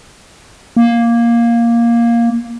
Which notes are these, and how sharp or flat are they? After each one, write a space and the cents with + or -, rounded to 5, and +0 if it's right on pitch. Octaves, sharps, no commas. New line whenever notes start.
A#3 +5